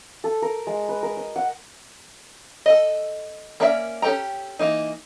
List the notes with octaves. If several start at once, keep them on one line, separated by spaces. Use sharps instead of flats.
A4
A#4
G#3
B4
A#4
D#5
F#5
A4 D#5
A#3 C#4 A#4 D5 E5
C#4 G4 A4 G5 A#5
E3 A#3 D#4